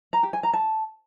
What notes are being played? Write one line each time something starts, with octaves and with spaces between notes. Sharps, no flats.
A#5
G4
G#5
A#5
A5